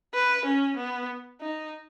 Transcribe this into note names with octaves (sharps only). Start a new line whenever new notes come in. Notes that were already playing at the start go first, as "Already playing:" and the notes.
B4
C#4
B3
D#4